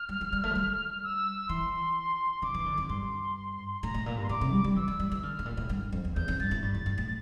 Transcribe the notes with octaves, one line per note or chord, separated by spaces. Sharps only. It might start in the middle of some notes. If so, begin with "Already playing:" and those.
Already playing: F6
G3
F3
G3
A3
F3
G3
E6
E3 C6
D3 D6
E3
D3
F2
G2 C6
A2 A#5
A2
A#2
G2
C6
A2 D6
C3
G3
G3
E3 E6
G3
G3
E3
D3 F6
A2
A#2
A2
G2
F2
E2
E2 G6
F2
G2 A6
A2
G2 A6
E2
G2
A2